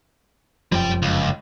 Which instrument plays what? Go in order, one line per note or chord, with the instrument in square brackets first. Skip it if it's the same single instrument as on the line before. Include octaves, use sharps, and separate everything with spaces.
[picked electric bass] F1 F#2 F3 [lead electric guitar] G3 G5
[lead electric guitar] C#2